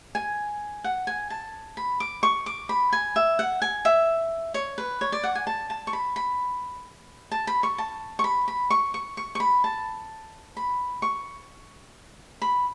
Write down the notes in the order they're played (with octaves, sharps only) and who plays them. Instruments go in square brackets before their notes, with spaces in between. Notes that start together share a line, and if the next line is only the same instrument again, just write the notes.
[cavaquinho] G#5
F#5
G#5
A5
B5
D6
C#6
D6
B5
G#5
E5
F#5
G#5
E5
C#5
B4
C#5
D5
F#5
G#5
A5
A5
C#6
B5
B5
A5
B5
C#6
A5
C#6
B5
B5
C#6
C#6
C#6
C#6
B5
A5
B5
C#6
B5